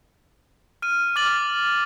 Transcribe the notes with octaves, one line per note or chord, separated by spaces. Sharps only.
F6 D#7
D6 F6 A6 F#7